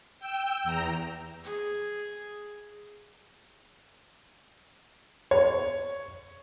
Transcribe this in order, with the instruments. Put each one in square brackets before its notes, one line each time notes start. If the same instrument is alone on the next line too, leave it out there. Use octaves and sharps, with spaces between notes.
[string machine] G5 E6
E2 A#5
[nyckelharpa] G#4
[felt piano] C#5